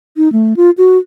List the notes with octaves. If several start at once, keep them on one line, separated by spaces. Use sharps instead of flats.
D#4
A3
F4
F#4